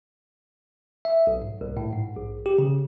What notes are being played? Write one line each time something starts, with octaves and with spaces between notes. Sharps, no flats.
E5
B1
G#2
C2
A2
G#2
A#1
G4
C#3